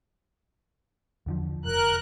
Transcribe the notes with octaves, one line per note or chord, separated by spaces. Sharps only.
E2 D3 F3
F1 A#4 F#6